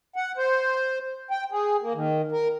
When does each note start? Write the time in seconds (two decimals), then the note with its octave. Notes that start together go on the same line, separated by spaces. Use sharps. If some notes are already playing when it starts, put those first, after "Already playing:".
0.16 F#5
0.37 C5
1.31 G5
1.52 G#4
1.81 A#3
1.94 D#3
2.32 A#4